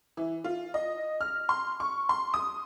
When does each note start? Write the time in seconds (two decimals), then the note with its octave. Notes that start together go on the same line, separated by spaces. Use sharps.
0.17 E3
0.44 F4
0.74 D#5
1.21 F6
1.49 C6
1.80 C#6
2.09 C6
2.34 D#6